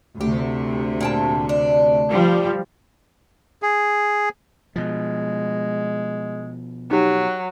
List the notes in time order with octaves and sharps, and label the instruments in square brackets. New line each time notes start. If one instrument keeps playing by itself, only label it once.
[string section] D2 C3 [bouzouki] G4
[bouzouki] A#2 G5 A5
D4
[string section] F3 G3
[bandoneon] G#4
[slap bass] B2 F3 [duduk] G#3
[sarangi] F#3 [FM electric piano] D#4 G4